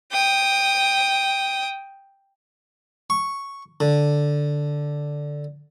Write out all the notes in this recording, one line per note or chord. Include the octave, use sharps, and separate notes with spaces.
G5 D#6
C#6
D3